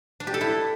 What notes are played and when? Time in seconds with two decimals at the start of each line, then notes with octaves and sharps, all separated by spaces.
0.20 D4
0.27 G4
0.34 A4
0.41 E4